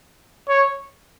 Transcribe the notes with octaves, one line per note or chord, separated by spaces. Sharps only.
C#5